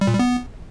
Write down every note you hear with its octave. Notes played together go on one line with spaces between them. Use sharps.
G3
A#2
G3
B3